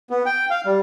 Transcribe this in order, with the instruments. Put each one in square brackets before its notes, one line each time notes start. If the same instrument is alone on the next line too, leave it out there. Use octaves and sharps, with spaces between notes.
[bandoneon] B3
G5
F5
G3